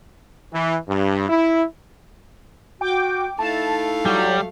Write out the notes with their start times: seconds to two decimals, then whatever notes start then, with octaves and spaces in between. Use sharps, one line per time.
0.53 E3
0.89 G2
1.29 E4
2.81 F#4 G5 D6
3.39 A3 D#4 E4 F5 A5
4.06 F#3 G3